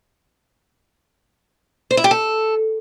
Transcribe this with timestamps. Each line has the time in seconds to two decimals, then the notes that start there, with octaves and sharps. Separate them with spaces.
1.91 C5
1.97 E4
2.04 G4
2.11 A4